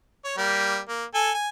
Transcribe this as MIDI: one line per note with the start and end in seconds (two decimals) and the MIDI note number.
0.25 0.37 73
0.38 0.78 55
0.38 0.78 58
0.88 1.04 58
1.14 1.31 69
1.14 1.31 80
1.34 1.48 80